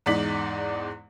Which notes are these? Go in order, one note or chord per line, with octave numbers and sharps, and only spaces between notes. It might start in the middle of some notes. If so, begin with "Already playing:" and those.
E2 G#2 D#4 D5 B6 F#7